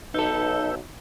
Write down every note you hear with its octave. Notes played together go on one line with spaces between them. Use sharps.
B1 D#4 A4 B4 E6 G6